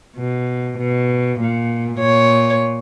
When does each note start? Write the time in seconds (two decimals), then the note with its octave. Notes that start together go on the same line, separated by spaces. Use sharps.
0.17 B2
0.79 B2
1.39 A#2
2.00 A#2 C#5